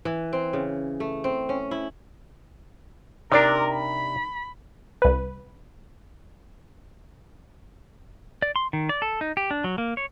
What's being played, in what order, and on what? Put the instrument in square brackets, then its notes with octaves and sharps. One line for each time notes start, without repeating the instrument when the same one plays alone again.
[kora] E3
C4
C#3
A3
C4
C#4
E4
[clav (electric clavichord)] C3 D4 [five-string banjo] D#4 D5 [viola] A#4
[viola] B5
[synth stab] C2 B4
[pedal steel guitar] D5
C6
D#3
D5
A4
D#4
G4
D4
F#3
A#3
C#5